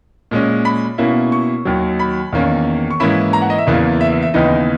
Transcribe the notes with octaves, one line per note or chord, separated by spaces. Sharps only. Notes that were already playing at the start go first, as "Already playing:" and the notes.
A#2 G#3 C#4
B5
B2 A#3 C#4 E4
C#6
D#2 D#3 F#3
B5
E2 D#3 A#3 C#4
C#6
G#2 E3 A#3 C#4 E4 B5
A#5
F#5
D#5
E5
E2 C#3 E3 A#3
E5
E5
E5
D#2 C#3 E3 B3 D#4 D#5